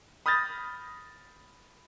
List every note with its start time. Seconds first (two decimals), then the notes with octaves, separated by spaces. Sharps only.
0.26 B5 D#6 F6 G6 A6 A#6